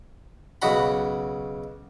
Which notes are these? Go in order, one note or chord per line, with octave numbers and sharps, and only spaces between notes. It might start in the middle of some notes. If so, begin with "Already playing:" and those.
B1 C#3 F#4 F#5 B5